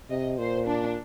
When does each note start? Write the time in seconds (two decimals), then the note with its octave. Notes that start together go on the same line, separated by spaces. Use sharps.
0.10 C3 D#5
0.38 A#2 C5
0.67 D4